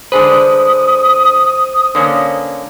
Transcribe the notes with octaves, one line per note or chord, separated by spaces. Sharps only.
D3 G#4 B4 C5 D#6
D3 A#3 C#4